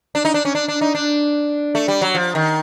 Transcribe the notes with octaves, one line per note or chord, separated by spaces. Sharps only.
D4
D#4
D4
C#4
D4
D4
D#4
D4
A3
G3
F#3
F3
D#3